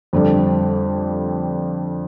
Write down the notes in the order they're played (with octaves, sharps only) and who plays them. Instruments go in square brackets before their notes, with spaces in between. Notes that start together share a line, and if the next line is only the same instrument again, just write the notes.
[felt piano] F2 D3 G3 D4